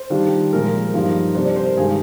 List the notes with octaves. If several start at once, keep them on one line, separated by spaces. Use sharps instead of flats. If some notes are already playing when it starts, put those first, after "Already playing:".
Already playing: C5
D#3 G3 D4 F4
A#2 F3 G#3 A#4
G2 F3 A#3 D#4
C3 G3 D4 C5
D5
C5
A#4
G2 D#3 G#3 D4 F4 G#4